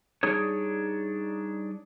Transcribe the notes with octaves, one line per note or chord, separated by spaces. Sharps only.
G3 D4 D#4 G#4 C#5